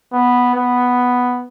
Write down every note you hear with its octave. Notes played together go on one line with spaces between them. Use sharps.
B3
B3